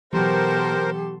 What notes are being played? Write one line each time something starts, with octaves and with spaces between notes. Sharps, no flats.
B2 E3 F#3 G4 A4 A#4 C5 C6